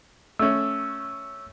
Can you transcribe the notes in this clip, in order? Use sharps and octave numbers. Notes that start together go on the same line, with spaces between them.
A3 C#4 E6